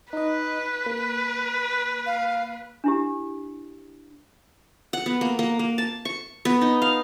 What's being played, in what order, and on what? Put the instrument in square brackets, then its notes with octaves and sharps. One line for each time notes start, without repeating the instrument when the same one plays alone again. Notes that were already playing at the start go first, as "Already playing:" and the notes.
[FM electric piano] D#4 D#5 [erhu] B4
[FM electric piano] A#3
[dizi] F5
[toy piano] D4 E4 G4
[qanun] F#5
B3
A#3
A#3
A#3
A5
C#6
B3
D#4
F5